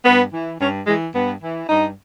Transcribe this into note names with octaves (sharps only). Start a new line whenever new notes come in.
G2 B3
E3
G2 C#4
E3 G#3
G2 B3
E3
G2 D#4